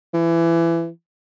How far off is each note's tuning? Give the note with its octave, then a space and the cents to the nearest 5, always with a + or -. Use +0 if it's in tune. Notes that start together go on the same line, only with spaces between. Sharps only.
E3 +25